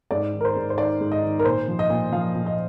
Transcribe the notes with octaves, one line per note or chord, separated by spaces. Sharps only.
G#2 D5
D#3
A#4
C5
G#2
C5
D#3 D5
G#2
D#5
D#3
A#4
A#2 C5
F3
D#5
A#2
F3 F5
A#2
D#5